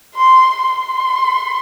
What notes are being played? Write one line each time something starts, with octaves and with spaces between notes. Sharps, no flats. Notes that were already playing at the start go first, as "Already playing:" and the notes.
C6
C6